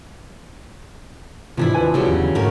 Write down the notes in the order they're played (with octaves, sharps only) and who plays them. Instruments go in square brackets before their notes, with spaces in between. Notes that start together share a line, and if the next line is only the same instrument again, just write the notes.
[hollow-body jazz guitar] G#2 C3 E3 [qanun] F3 D4 E4
[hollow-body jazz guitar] D#2 B4 G#5
[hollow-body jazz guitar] C2 [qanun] C#3 F#3 G3
[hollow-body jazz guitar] E2 D3
[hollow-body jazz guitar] G#2 D3 [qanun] A3 A#4